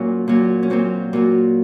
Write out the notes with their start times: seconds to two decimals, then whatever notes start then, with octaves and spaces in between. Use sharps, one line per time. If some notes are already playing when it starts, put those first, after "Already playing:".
Already playing: A#2 F#3 C#4
0.28 A#2 F#3
0.63 C#4
0.70 A#2 F#3 C4
1.13 A#2 F#3